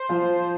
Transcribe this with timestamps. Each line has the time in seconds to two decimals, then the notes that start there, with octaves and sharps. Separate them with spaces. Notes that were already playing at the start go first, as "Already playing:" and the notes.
Already playing: C5
0.09 F3 F4